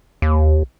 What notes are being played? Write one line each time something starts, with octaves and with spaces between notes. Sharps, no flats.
D#2